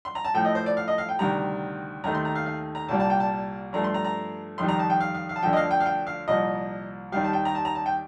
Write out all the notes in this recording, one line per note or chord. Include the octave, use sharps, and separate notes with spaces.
C6
A#5
A5
A2 F3 A3 G5
D#5
C5
D5
F5
D#5
F5
G5
D2 C3 D#3 G3 A#5
D#2 D#3 A3 A#5
C6
A#5
F5
F5
A#5
C2 A#2 G3 A5
A5
G5
A5
G2 F3 A3 A#5
C6
A#5
A#5
F2 D#3 G3 C6
A#5
A5
G5
F5
F5
F5
A5
D2 D3 F3 G5
D#5
F5
G5
F5
G5
F5
C2 A#2 F3 D#5
D#2 D#3 G3 F5
A5
G5
A#5
A5
A#5
A5
G5